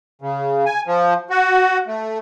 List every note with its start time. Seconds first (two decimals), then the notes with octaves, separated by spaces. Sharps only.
0.22 C#3
0.66 G#5
0.87 F3
1.30 F#4
1.87 A3